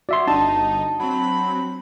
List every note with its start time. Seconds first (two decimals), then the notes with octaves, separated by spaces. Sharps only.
0.09 F#4 D5 E5 C6
0.27 G1 D4 D#4 A5
1.00 F#3 C4 B5